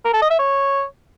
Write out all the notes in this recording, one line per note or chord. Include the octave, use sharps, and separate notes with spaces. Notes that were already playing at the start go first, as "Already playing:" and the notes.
A#4
A4
D#5
E5
C#5